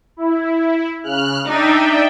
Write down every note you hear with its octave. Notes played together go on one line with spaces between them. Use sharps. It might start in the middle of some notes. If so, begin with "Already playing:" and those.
E4
C#3 F6 F#6
D4 D#4 D5 E5 G5